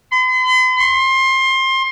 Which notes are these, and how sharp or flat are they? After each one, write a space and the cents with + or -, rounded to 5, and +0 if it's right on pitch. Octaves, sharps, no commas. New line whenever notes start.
C6 -45
C6 +25